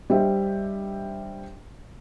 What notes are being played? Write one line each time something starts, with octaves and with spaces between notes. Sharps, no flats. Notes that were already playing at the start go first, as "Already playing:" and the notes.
G3 D4 G4 C5 D#5 E5